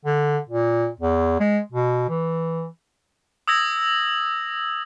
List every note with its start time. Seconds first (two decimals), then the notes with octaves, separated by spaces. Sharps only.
0.05 D3
0.49 A#2
1.00 E2
1.40 G#3
1.72 B2
2.09 E3
3.48 D#6 E6 G#6 A#6 F#7